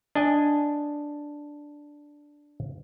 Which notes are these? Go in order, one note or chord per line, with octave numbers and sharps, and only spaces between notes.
D4 D#5 G#5